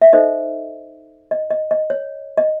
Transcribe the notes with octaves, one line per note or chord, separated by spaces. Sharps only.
E5
D#4 A4 C5 D#5
D#5
D#5
D#5
C#5
D#5